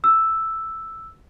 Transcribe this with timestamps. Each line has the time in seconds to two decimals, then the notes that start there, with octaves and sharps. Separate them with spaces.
0.04 E6